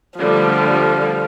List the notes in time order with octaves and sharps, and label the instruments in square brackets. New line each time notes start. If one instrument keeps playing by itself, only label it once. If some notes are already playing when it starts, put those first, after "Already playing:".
[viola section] D3 G3 A3 [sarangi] F3